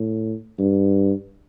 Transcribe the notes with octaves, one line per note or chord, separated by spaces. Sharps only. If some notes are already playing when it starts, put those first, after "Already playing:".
Already playing: A2
G2